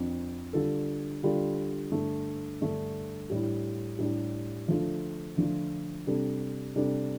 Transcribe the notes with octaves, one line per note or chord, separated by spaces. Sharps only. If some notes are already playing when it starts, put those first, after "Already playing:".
Already playing: F2 F3 D4
D3 G3 F4 A4
D3 G3 F4 A4
G2 D3 A3
G2 D3 A3
A2 G3 D4 G4
A2 G3 D4 G4
D3 F3 A3 D4 F4
D3 F3 A3 D4 F4
C3 G3 D4 A4
C3 G3 D4 A4